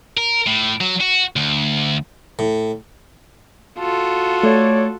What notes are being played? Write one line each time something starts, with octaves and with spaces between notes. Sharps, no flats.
A#4
A2
F#3
F#4
D2
A2
F4 F#4 A4
A3 C#5 D5